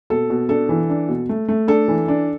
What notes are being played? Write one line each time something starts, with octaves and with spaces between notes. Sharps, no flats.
B2 A4
B2
D4 A4
E3
D4
B2
A3
A3
D4 A4
E3
D4